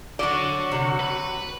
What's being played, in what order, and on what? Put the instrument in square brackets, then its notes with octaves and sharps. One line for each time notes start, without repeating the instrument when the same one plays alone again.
[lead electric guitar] D3 [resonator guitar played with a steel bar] F#3 D5 [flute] F#4
[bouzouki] C3
[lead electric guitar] B4 B5